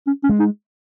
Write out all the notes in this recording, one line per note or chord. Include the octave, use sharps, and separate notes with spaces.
C#4
C#4
G#3
D#4